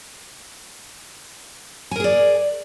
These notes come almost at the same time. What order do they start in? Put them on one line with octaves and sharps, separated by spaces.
G#5 A#4 G#4 D5